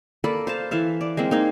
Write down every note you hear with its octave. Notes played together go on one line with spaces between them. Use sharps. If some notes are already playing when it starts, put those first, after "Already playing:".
A#3 A4 D5 B5
C5 F5 A5
E3 A4 E5 F5
D5
G#3 A#3 C4
A#3 D#4 G#4